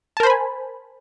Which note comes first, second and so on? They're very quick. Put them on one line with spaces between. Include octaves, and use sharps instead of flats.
A5 A#4 C5 B5 G#5